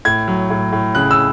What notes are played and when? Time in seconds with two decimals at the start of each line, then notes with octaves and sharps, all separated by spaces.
0.05 A2 G#6
0.28 F#3
0.50 A2
0.72 A2
0.95 C#3 F#6
1.11 E6